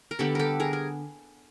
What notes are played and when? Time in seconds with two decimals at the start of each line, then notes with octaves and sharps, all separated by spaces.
0.11 A#4
0.19 D3 G3 B3 G4 A4
0.35 G4 A4 A#4
0.60 G#4 A#4
0.73 A#4